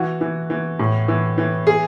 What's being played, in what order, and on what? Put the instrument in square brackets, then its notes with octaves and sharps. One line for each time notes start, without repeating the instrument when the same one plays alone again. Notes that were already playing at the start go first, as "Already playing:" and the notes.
Already playing: [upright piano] E3 F#4
E3
E3
A2
E3
E3
G#4